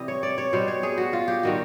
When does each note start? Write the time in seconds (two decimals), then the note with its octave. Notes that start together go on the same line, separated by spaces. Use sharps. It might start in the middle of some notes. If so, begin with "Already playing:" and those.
Already playing: C3 E3 G3 D#5
0.08 C#5
0.23 D5
0.38 C#5
0.53 B2 G3 C5
0.68 C#5
0.83 G#4
0.98 F#4
1.13 F4
1.28 G4
1.43 D#3 G3 F#4